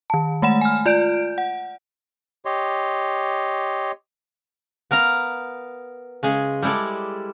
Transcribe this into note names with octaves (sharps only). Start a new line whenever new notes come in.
D#3 A5
G#3 A3 F#5 E7
G#5 F6
F4 D5 G6 D7
F#5
G4 C#5 D#5 C6
B3 A#4 F5 A#5
C#3 G#3 G#4
G3 G#3 E4 A4 D5